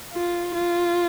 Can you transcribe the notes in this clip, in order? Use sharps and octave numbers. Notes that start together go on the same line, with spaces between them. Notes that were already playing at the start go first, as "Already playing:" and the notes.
F4
F4